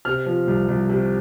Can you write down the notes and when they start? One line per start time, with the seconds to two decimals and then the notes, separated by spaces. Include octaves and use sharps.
0.05 C3 F6
0.26 F3
0.47 C2
0.68 C2
0.89 C3